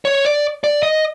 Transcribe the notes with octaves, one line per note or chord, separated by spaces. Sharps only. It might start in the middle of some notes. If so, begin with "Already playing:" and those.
C#5
D5
D5
D#5